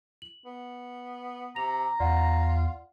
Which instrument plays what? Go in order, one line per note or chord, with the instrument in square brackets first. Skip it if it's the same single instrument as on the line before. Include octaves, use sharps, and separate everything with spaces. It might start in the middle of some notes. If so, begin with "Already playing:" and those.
[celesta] F#7
[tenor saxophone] B3
[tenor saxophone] C3 [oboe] A#5 [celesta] F7
[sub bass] E2 [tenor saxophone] F4 [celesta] D5 F#5